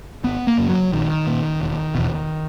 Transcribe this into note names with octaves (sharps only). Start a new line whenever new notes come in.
G#1 B3
A#3
F#2 C#3
F#3
A#1 D#3
A#2
E1
E2 B2